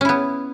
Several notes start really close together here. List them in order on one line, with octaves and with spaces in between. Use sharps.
C#4 E4 B3